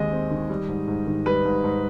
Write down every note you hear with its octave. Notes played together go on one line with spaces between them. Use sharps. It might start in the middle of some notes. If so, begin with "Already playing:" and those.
Already playing: D#2 D#3 G#3 C4 D#5
C4
D#3
G3
G#2
G#2
D#3
G3 B4
G#2
G#2